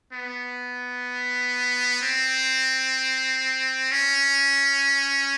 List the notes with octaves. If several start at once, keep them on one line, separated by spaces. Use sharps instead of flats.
B3
C4
C#4